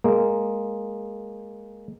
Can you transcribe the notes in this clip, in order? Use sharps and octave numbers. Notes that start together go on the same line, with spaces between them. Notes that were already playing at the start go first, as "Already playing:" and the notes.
G#3 A#3